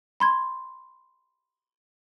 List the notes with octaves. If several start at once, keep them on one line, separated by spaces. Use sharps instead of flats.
B5 C6 G#6